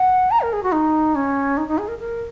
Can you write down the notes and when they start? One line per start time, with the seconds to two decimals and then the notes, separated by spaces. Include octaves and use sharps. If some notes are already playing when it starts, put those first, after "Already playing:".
Already playing: F#5
0.31 A#5
0.41 A#4
0.53 G#4
0.63 F#4
0.73 D#4
1.15 C#4
1.57 D#4
1.68 D#4
1.78 G#4
1.88 A#4
1.99 A#4